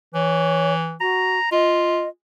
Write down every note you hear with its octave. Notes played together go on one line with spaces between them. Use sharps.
E3 C#5
F#4 A#5
F4 D#5